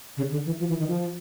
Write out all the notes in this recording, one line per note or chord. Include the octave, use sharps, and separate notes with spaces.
C#3
D3
E3
F3
E3
D#3
F3